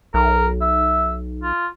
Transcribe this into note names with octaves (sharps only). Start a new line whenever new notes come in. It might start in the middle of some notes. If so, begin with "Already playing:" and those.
B1 A#4
E5
F4